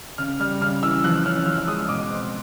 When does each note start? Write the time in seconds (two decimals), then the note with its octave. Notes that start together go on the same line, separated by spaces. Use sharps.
0.18 C#3 F6
0.40 G3 F6
0.61 C#3 F6
0.82 E3 E6
1.04 F3 F#6
1.26 C#4 F6
1.46 F3 E6
1.58 E6
1.67 G#3 D#6
1.89 B2 D6
2.10 C4